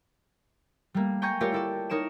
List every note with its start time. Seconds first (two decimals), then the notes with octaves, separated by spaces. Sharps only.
0.94 G3 A3 A#3
1.22 G5 G#5 A#5 C#6 G6 G#6
1.40 A3 F4 G4 A#4 C#5 D5
1.52 E4 A4 D5
1.90 D#4 A#4 C#5 D7 E7